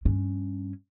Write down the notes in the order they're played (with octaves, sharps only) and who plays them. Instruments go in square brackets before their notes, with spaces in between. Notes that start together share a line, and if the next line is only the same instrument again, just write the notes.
[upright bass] G2 C#4